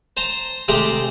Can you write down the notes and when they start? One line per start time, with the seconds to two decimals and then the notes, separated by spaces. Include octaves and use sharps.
0.17 C5 A5 A#5
0.68 C3 G#3 A3 G4 C5 A#5